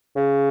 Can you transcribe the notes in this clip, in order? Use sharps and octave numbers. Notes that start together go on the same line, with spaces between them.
C#3